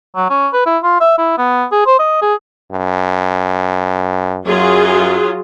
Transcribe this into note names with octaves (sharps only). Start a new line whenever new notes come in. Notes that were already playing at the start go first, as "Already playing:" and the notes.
F#3
C#4
B4
E4
F4
E5
E4
B3
G#4
C5
D#5
G#4
F#2
F#2 F#3 F4 G#4